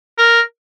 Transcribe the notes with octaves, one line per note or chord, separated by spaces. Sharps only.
A#4